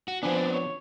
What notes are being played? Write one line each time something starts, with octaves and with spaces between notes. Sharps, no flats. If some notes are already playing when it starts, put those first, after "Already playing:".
F#4
F3 B3 C4 D4 G#5
D5
C#5